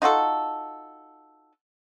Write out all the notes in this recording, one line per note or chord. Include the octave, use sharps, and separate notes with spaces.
D#4 F4 F#4 A4